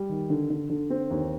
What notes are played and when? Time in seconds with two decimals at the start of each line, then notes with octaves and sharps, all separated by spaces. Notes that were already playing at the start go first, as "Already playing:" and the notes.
Already playing: G3
0.09 D#3
0.30 D3
0.50 D3
0.70 D3
0.90 C4
1.11 D#2